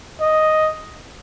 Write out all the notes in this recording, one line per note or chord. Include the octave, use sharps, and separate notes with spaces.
D#5